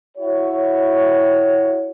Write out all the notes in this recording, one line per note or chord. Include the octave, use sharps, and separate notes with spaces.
E4 F#4 C#5